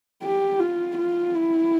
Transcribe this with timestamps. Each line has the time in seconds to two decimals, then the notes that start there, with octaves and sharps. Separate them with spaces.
0.23 G4
0.60 F4
0.97 F4
1.34 E4